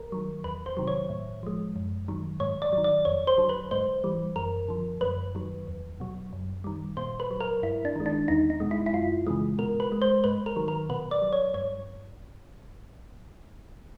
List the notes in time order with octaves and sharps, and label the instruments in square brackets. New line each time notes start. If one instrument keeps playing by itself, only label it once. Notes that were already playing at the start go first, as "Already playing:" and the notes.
Already playing: [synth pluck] A#4
D#3 F#3
E2 B4
C5
C3 D#3 F#3
C#5
A2
F3 G#3
F#2
D#3 F#3
G#2 C#5
D5
D#3 F#3
D5
F2 C#5
C5
D3 F#3
B4
G#2 C5
E3 G3
F#2 A#4
D3 F3
F#2 B4
D#3 F#3
E2
B2 F#3
F#2
D#3 G3
A#2 C5
B4
F#3
A#4
G2 E4
D4
D#3 G#3
D4
E2 D#4
D#4
B2 G#3
E4
E4
F#2 F4
C#3 E3 G#3
B2 A#4
B4
G#3
C5
G#2 B4
A#4
D#3 F#3
A#4
B2 B4
D5
F#3
C#5
G2 C#5